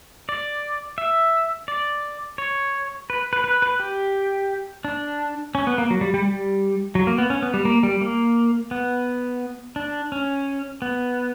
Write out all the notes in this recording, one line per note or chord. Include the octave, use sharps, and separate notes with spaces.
D5
E5
D5
C#5
B4
B4
B4
B4
G4
D4
C#4
B3
A#3
F#3
G3
G3
G3
F#3
A#3
B3
C#4
B3
G3
A#3
G3
A#3
B3
D4
C#4
B3